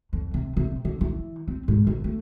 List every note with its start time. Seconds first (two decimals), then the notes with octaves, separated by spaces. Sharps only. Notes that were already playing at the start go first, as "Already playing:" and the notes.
0.13 F2
0.34 C3
0.57 C3
0.85 D3
1.01 E3
1.48 C4
1.68 G#2
1.87 G1
2.04 A3